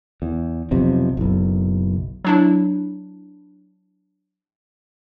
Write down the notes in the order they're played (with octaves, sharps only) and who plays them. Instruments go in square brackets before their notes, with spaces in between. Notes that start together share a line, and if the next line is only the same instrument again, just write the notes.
[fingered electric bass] E2
B1 F2 C3
F#1 B1
[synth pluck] F#3 D4 E4